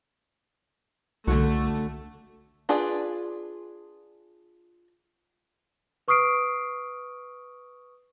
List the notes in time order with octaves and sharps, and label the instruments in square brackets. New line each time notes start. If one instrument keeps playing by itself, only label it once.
[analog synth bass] C2 [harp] D3 F#4 [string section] A3
[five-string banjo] D4 F4 G#4 B4 D5
[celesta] B4 C#6 D#6 F6 C7 D7